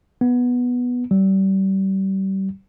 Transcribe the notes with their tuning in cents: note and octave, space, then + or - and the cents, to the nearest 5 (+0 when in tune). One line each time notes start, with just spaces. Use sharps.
B3 -5
G3 -30